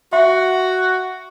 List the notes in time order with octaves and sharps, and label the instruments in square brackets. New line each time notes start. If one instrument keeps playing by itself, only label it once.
[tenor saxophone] F#4 [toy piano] E5 F#5 C6